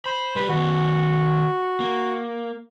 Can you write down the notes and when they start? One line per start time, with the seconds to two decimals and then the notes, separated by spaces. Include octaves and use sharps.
0.06 C5 B5
0.36 G3 G4 B4
0.49 D#3 B3 F#4
1.80 A#3